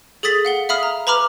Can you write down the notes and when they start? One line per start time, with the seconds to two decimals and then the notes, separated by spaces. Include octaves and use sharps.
0.23 G#4 A4 D#6 A6 B6 F#7
0.45 F5 F#5 G7
0.69 E5 F5 B5 D#6 F6
0.83 A#5
1.07 B4 A#5 B5 D6 F6